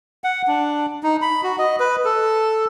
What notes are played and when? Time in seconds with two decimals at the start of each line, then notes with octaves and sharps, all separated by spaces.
0.24 F#5
0.48 D4
1.03 D#4
1.22 B5
1.43 F#4
1.59 D#5
1.80 B4
2.05 A4